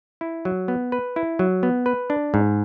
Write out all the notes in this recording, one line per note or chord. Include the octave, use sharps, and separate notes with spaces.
E4
F#3
B3
B4
E4
F#3
B3
B4
D4
G#2